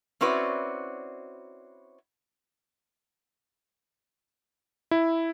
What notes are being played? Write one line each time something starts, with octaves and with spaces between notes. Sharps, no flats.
C4 C#4 E4 F#4 B4 D5
E4